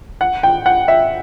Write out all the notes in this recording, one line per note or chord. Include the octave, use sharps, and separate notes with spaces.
F#5
G5
F#5
E5